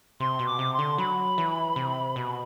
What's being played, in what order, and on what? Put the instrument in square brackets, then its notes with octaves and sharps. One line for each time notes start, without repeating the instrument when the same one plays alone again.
[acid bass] C3 [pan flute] C6
[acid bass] B2
[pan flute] D6
[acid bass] C3
[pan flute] C6
[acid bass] D3
[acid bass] F#3 [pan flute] B5
[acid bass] E3
C3
B2